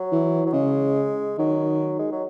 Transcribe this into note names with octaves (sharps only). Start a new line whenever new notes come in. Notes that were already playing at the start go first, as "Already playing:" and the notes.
Already playing: F#3
E3
F#3
C#3 G#3
D#3 F#3
G#3
F#3